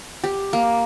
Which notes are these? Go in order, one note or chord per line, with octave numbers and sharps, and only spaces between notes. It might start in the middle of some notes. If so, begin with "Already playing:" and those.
G4
A#3